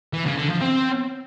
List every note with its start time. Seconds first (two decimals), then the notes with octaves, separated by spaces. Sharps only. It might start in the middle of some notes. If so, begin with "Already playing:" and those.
0.13 E3
0.25 C#3
0.37 D3
0.49 F3
0.61 C4